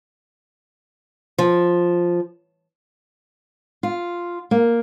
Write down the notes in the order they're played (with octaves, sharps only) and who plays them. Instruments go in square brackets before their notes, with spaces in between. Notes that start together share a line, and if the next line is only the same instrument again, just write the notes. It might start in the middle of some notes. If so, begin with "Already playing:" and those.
[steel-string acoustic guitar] F3
F4
A#3